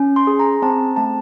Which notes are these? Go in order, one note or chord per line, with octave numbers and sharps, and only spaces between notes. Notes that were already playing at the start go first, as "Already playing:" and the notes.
Already playing: C#4
C6
G#4
A#5
C4 A5
A3 A5